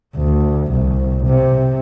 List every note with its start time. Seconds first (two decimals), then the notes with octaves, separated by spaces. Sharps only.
0.16 D2
0.71 C2
1.26 C3